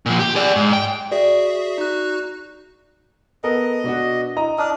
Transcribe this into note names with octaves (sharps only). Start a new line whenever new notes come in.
A#2 F3
G4
G#4 D5
G#2
G5
F#4 G#4 D5 E5
D#4 F#4 F#6
B3 A4 A#4 D#5
B2 D4 F#4
E4 D#5 A#5
D4 D#5 D#6 F6